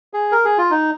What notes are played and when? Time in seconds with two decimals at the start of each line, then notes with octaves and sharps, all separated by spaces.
0.14 G#4
0.32 A#4
0.45 G#4
0.58 F4
0.71 D#4